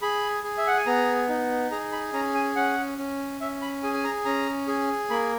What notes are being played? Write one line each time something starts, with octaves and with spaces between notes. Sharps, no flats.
G#4 B5
G#4
E5
F#5
G#5
B3 A#5
D#4
G#4 A#5
B5
C#4 A#5
G#5
C#4 F#5
C#4
C#4 E5
B5
G#4 G#5
G#5
A#5
C#4 A#5
G#4
A#3 B5